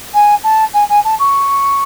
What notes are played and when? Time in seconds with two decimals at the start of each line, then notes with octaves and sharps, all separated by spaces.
0.14 G#5
0.43 A5
0.73 G#5
0.89 G#5
1.04 A5
1.19 C#6